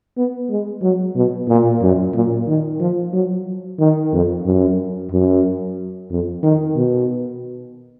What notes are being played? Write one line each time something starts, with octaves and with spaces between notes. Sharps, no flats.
B3
G#3
F#3
B2
A#2
F#2
A#2
D#3
F3
F#3
D#3
F2
F#2
F#2
F2
D#3
B2